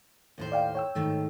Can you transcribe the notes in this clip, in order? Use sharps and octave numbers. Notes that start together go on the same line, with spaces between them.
D#2 A2 C5
D5 F5 G5
C#5 G5 E6
G#2 D#3 A3